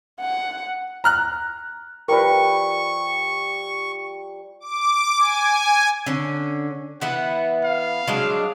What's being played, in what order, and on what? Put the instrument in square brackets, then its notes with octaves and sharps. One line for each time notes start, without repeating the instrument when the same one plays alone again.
[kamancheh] F#5
[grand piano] A#5 F6 F#6
[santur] F3 G3 G5 [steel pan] A#4 B4 [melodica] C#6
[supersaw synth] D6
G#5
[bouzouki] D3 C#4
[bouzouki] E3 B3 E4 [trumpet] F#5
[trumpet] F5
[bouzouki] F#3 G#3 D4